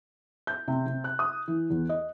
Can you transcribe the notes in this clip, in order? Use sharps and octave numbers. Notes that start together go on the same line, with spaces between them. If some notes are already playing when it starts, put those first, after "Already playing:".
G6
C3
C3
F#6
D#6
E3
E2
D#5